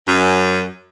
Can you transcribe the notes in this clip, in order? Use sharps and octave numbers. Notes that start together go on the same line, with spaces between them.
F#2